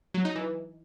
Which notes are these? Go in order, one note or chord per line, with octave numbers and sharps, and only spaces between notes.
F#3
D#4
E3